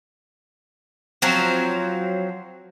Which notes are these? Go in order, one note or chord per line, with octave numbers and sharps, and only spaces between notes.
F3 F#3 C4